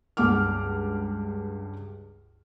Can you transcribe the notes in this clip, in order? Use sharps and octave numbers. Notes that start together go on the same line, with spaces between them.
C#2 G2 F#5 D6 F6